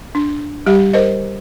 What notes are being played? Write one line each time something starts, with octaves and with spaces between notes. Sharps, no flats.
D4
G3 G4 E5
A#4 C5 D#5